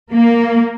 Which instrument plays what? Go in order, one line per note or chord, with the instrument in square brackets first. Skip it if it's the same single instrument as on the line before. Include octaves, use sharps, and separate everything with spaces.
[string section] A#3